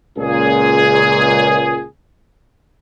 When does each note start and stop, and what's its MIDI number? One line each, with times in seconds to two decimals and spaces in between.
0.17 1.85 37
0.17 1.85 46
0.17 1.85 68